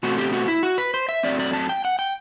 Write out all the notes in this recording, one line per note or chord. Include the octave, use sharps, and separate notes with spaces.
B2 A3 C4 F#4
G4
F#4
E4
F#4
B4
C5
E5
F#2 F#3 A3 C4 D5
D5
A5
G5
F#5
G5